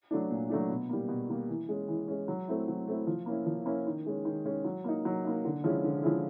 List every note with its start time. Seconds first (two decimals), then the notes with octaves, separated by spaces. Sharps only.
0.11 F#3 A3 D4
0.30 A#2
0.49 F#3 A3 D4
0.69 B2
0.89 G3 A#3
1.08 B2
1.29 G3 A#3
1.49 E3
1.69 G#3 C#4
1.88 E3
2.08 G#3 C#4
2.28 F#3
2.47 A3 C4 E4
2.68 F#3
2.88 A3 C4 E4
3.07 F3
3.26 A#3 C#4 E4
3.46 F3
3.66 A#3 C#4 E4
3.86 D#3
4.06 G#3 C#4
4.25 D#3
4.45 G#3 C#4
4.64 F#3
4.84 A#3 D#4
5.05 F#3
5.24 A#3 D#4
5.45 D3
5.64 F3 G#3 C#4 E4
5.84 D3
6.03 F3 G#3 C#4 E4